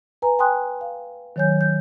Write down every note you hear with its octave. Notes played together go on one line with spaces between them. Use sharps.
B4 G#5 A#5
G5 G#5 C6 D#6 F#6
F5
D#3 F#3 C#5 G#5 G6
G6